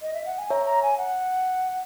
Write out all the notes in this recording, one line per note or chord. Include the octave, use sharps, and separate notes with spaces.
D#5
E5
F#5
G#5
C#5 E5 A#5
A#5
G#5
F#5